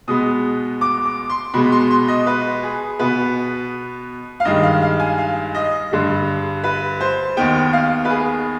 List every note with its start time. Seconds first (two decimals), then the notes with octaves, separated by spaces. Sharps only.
0.08 B2 G#3 B3 D#6
0.81 D6
1.06 D6
1.30 C6
1.54 B2 G#3 B3 B5
1.72 C6
1.90 C6
2.08 D#5
2.27 B4
2.63 G#4
2.99 B2 B3 B4
4.40 F5
4.45 G2 D#3 G#3 D#5
4.63 F5
4.82 F5
5.00 G#5
5.18 F5
5.55 D#5
5.91 G2 D3 G3
6.64 B4
7.01 C5
7.37 D#2 D#3 B3 G5
7.73 F5
8.05 B4
8.10 G#4